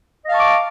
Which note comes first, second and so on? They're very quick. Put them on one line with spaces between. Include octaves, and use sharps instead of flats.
D#5 F5 A5 C#6 D6